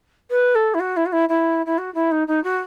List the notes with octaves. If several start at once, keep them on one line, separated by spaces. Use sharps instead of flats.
B4
A4
E4
F#4
E4
F#4
E4
E4
E4
F#4
E4
D#4
D#4
F#4